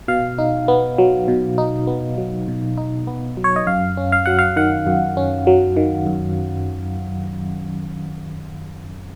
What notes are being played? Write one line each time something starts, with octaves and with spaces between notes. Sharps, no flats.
B2 F5
D#4
B3
F#3
B2
D#4
B3
F#3
B2
D#4
B3
F#3
C#5
D#5
F#2 F5
C#4
F5
F#3 F#5
F5
D#3 F#5
F#2
C#4
F#3
D#3
F#2